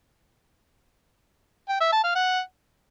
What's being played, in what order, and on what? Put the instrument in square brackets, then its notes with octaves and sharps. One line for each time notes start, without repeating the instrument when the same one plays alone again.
[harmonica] G5
E5
A5
F5
F#5